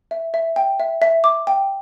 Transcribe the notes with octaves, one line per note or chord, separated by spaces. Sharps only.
E5
E5
G5
E5
E5
D6
G5